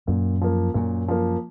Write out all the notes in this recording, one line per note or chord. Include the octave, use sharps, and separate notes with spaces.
F#2 A#2
F3 A#3
F#2 A#2
F3 A#3